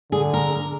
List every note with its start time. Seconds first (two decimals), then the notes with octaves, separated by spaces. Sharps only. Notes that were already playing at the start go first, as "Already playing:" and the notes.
0.11 D3 G#4
0.34 A#4